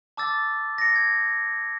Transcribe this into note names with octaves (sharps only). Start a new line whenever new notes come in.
A5 D6 E6 A6
A#6 C#7
G#6